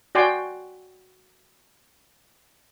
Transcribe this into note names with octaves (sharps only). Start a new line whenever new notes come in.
F#4 D5 G5 G#5 C6